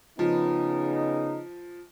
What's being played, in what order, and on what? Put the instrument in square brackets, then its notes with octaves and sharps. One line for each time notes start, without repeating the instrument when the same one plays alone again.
[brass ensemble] C#3 B3 D#4 [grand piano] F3